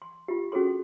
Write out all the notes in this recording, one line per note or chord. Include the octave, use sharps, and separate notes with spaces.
C6
F4 G4
C#4 F#4 G#4 A4 C6